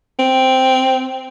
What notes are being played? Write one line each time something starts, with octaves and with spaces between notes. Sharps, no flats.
C4